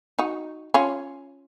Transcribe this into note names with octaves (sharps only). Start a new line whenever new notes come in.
D#4 F#4
C#4 F4